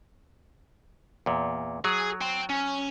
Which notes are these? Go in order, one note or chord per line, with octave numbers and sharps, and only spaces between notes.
E2 A#2
F#3 G#4
G5 C6
C#4